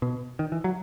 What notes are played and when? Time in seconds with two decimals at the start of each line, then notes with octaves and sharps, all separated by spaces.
0.02 B2
0.39 D#3
0.52 E3
0.64 F#3